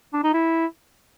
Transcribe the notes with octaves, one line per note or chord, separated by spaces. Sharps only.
D4
D#4
E4